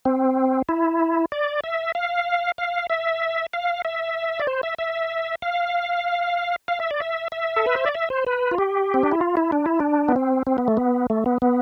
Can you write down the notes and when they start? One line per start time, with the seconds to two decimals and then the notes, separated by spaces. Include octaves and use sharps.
0.05 C4
0.69 E4
1.32 D5
1.64 E5
1.95 F5
2.58 F5
2.90 E5
3.53 F5
3.85 E5
4.40 D5
4.47 C5
4.63 E5
4.78 E5
5.42 F5
6.68 F5
6.80 E5
6.91 D5
7.00 E5
7.32 E5
7.56 A4
7.66 B4
7.75 C5
7.86 D5
7.95 E5
8.10 C5
8.27 B4
8.51 F4
8.58 G4
8.94 C4
9.03 D4
9.11 E4
9.21 F4
9.37 E4
9.52 D4
9.66 E4
9.80 D4
10.08 B3
10.16 C4
10.47 C4
10.58 B3
10.68 A3
10.77 B3
11.10 A3
11.26 B3
11.42 B3